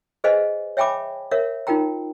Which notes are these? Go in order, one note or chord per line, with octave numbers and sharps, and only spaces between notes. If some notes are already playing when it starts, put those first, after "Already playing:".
G#4 B4 C5 D#5 F5 G#5
C#5 E5 G5 G#5 B5 D6
A#4 C#5 E5 F5
D#4 F4 A#4 G5 A#5